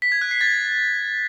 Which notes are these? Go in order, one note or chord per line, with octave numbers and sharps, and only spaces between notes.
B6
G#6
F#6
C7
A6